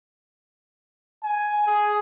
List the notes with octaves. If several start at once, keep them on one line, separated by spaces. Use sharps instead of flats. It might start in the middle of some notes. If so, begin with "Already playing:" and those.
G#5
G#4